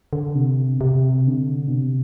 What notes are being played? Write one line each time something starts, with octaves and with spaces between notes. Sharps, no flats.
D3
C3
C3
D3
B2
C3